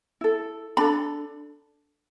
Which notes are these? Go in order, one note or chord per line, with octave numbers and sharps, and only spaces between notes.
E4 A4
D4 A4 B5